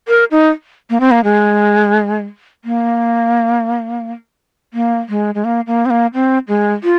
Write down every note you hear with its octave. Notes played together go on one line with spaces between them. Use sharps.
A#4
D#4
A#3
C4
A#3
G#3
A#3
A#3
G#3
G#3
A#3
A#3
C4
A#3
C4
G#3
F4